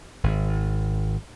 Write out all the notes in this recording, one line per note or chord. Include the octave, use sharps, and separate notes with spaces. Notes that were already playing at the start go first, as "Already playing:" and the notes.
G#1